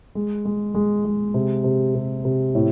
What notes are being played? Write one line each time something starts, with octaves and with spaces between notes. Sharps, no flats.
G#3
G#3
G#3
G#3
C3
C3
C3
C3
A2